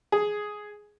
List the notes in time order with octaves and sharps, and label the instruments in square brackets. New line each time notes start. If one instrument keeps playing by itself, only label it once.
[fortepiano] G#4